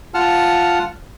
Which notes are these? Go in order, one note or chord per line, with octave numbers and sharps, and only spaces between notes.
F4 F#5 A5 F6